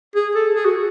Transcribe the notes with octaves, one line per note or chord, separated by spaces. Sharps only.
G#4
A4
G#4
F#4